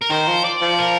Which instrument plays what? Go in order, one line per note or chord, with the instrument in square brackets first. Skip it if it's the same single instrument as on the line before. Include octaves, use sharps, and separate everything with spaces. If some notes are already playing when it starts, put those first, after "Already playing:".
[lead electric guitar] A#4
[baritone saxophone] D#3 [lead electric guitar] C5
[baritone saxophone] F3
[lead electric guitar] D5
[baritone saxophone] F3
[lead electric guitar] A#4